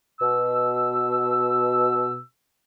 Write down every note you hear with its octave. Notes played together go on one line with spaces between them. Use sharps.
B2 E6